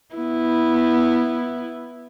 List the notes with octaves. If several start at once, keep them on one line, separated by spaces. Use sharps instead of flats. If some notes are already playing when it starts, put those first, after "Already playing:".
B3 E4